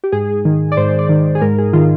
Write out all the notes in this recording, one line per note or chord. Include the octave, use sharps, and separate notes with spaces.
G4
G#2 G#4
D#3
D5
G#2 C5
D5
D#3
G#4
G#2 A#4
G#4
D#3 F4